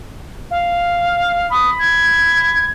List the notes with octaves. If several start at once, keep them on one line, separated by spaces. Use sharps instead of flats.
F5
B5 D#6
G#6